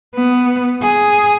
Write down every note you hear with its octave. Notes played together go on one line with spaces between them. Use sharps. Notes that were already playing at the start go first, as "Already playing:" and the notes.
B3
G#4